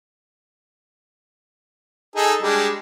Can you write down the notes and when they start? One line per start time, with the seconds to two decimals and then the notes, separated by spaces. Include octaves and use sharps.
2.16 D#4 G#4 A4
2.42 G3 G#3 D4